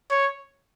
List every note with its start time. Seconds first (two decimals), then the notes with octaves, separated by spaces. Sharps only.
0.11 C#5